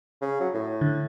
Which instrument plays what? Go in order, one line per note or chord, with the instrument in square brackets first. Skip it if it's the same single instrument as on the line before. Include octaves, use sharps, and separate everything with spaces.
[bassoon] C#3
F#3
A2
[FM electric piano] D3